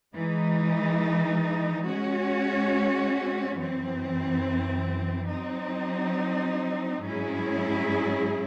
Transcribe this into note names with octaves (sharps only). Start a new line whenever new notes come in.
E3 G#3 D#4
G#3 C#4 F#4 C#5
F#2 E3 C4
F#3 C4 D#4
G#2 F#3 C#4 E4 G#4